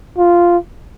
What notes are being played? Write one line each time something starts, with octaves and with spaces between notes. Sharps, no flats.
F4